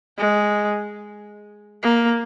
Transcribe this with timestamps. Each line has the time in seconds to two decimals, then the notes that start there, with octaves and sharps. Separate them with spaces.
0.18 G#3
1.83 A#3